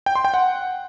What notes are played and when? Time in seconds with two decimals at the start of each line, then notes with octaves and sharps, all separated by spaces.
0.06 G5
0.15 C6
0.25 G5
0.34 F#5